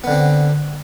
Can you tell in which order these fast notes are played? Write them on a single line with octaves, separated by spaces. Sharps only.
B3 D3 C4